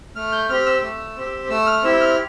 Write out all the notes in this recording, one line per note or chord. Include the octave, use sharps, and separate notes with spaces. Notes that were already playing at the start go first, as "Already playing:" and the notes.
A3 F6
G6
C4 G4 F6
E6
A3
C4 G4
A3 E6
F6
C4 E4 G4 E6
F6